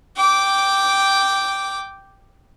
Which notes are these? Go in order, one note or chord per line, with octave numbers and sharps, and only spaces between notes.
G5 D6